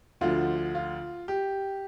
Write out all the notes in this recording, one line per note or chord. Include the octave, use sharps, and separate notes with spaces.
D2 D3 F3 F4
F4
G4